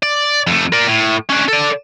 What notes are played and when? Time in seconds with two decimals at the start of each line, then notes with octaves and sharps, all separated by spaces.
0.02 D5
0.47 F2 A3
0.73 A#4 D5
0.87 A2
1.30 C#4 D4
1.49 A4 D5